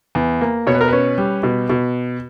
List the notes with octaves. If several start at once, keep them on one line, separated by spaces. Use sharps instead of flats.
E2
A#3
B2 C#5
B4
A#4
C#4 B4
G3
B2
B2